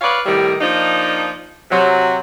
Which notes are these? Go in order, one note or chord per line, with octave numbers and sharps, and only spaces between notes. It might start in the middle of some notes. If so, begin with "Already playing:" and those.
B4 C#5 D5 F5
A2 C3 D#3 G3
F3 A#3 D4 D#4
C3 F#3